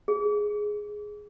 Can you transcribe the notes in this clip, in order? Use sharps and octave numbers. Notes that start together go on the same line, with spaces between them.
G#4